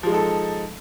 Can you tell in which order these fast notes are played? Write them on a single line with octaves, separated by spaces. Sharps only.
F3 G#3 D#4 A4